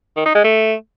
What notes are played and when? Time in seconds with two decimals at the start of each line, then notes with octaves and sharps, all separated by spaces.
0.17 D#3
0.26 D#4
0.35 G#3
0.44 A3